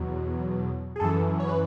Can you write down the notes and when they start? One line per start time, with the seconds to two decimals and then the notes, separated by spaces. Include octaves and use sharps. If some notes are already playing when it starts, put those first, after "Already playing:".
Already playing: E2 B2 F#3
0.96 G#4
1.00 F#2 E3 A4
1.40 C#5
1.49 B4